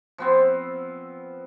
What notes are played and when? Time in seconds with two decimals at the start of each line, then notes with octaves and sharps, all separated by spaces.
0.18 F3 B3 C4